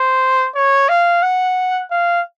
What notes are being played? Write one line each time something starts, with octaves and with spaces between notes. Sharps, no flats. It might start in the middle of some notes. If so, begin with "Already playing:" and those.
Already playing: C5
C#5
F5
F#5
F5